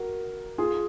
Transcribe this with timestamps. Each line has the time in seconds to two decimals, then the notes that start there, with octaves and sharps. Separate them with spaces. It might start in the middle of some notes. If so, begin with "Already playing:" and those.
Already playing: F#4 A#4
0.58 F4 G#4